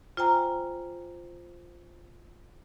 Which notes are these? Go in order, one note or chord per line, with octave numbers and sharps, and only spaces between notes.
F4 C5 G5 G#5 A#5